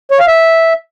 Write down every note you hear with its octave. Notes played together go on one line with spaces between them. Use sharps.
C#5
F5
E5